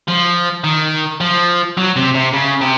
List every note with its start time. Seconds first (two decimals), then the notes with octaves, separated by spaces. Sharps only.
0.08 F3
0.64 D#3
1.20 F3
1.77 F#3
1.96 C3
2.15 C3
2.33 C#3
2.61 C3